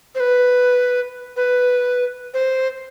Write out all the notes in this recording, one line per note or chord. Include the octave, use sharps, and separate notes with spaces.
C5
B4
B4
C5